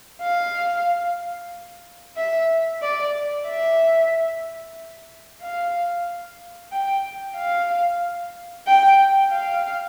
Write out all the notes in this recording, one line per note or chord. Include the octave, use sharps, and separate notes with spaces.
F5
E5
D5
E5
F5
G5
F5
G5
F5